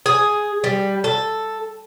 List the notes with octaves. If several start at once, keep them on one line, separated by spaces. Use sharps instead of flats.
G#4
G3
A4